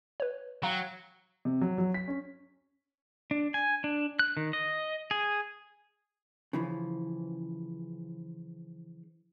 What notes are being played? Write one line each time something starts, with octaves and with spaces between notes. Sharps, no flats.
B4 C#5
F#3 F5 G5 A#5
C3
F#3
F#3
B6
C#4
D4
G#5
D4
F#6
D#3
D#5
G#4
C#3 E3 F3